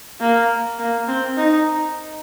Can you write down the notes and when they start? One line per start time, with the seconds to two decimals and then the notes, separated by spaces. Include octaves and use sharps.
0.20 A#3
0.79 A#3
1.08 C4
1.37 D#4